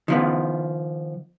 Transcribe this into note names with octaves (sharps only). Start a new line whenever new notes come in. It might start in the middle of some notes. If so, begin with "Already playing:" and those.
D#3 F3 B3